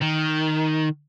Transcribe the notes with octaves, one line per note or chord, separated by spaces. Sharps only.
D#3